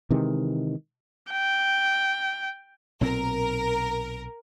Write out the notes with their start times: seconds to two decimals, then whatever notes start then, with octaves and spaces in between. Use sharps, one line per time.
0.11 C3 D#3 E3 G#3
1.31 G5
3.01 B1 A#2 C4 A#4